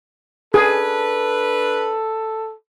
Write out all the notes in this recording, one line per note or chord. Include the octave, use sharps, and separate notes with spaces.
D4 G#4 A4 B4